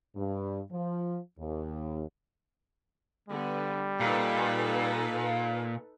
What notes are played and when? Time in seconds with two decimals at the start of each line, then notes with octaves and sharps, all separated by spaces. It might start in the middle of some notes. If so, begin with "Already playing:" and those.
0.15 G2
0.71 F3
1.39 D#2
3.29 D3 G3 B3
4.00 A#2 D#4 A4 B4